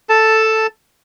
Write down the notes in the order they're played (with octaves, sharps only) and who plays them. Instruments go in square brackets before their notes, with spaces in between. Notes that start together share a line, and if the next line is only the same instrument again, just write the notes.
[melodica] A4 A5